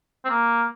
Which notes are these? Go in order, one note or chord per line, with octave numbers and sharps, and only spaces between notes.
C4
A#3